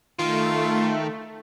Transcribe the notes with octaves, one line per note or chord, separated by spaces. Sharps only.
D#3 A3 F4